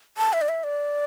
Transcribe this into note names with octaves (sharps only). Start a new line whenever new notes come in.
A5
E5
D5
E5
D5